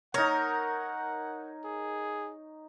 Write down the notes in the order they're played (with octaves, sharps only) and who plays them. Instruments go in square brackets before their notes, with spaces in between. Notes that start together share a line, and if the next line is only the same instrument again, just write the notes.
[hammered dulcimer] D#4 C#5 [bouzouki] A#4 [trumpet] F#5
[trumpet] G#4